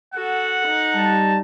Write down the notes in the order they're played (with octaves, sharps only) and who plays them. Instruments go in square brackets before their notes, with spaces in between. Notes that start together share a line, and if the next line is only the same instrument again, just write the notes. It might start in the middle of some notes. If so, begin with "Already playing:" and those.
[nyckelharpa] F#4 A4 [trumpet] F#5
[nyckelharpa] D#4
[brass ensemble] G3 A5